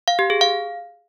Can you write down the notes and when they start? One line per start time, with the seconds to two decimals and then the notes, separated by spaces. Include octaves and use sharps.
0.08 F5
0.19 G4
0.30 G#4
0.41 F5